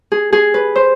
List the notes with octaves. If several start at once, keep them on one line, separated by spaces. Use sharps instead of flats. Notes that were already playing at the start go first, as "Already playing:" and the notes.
G#4
G#4
B4
C5